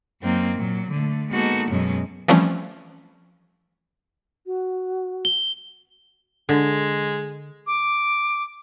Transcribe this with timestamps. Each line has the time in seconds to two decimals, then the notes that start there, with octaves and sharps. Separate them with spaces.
0.22 F#2 F#3 A#3 C4 D#4
0.56 A#2 F#3
0.90 D3 A3
1.30 G#3 A#3 B3 D#4 F#4 A4
1.70 F#2 B2 F#3 G#3 C#4
2.28 E3 F3 G3 A3 C4 C#4
4.46 F#4
5.25 G7
6.49 D3 G#3
7.67 D6